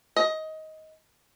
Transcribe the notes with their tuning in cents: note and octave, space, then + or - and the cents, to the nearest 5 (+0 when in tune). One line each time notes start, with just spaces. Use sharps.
D#5 +15